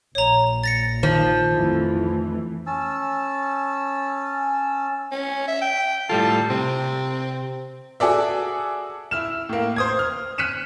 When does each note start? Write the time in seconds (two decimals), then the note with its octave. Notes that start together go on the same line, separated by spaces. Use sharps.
0.15 A#1 C#5 A#5
0.64 A6 A#6 C#7
1.03 D#3 F3
1.53 F2 E3 A3
2.67 C#4 A5 E6
5.12 C#4
5.48 E5
5.61 G5
6.09 A2 G3 F4 A4
6.50 C3 C4
8.00 F#4 G#4 A4 D5 E5
9.11 E4 F6 E7
9.49 A2 A#3
9.76 C5 D#6 G#6
9.99 F6
10.38 F6 F#6 B6 C#7 D#7 E7